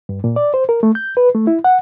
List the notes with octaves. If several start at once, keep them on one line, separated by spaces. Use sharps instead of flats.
G2
A#2
D5
C5
A#4
A3
G6
B4
A3
E4
F#5